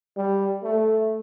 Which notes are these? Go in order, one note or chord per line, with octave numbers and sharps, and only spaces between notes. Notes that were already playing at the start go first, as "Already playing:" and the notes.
G3
A3